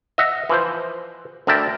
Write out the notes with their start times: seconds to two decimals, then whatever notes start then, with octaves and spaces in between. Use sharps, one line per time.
0.18 D#5 E5 F#5
0.49 E3 F3 C5
1.47 D2 D3 A#4 E5 G5 A5